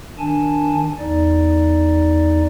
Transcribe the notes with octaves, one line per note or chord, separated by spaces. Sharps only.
D#3 D4 G#5 A5
E2 D#4 D5